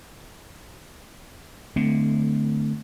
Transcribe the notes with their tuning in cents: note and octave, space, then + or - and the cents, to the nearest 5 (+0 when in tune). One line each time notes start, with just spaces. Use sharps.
D3 +15 A3 +0 C4 -35